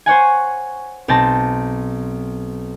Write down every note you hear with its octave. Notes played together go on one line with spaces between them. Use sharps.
C5 C#5 F#5 G#5
B1 C4 A5 A#6